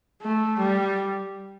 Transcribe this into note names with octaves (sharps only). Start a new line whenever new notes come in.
A3
G3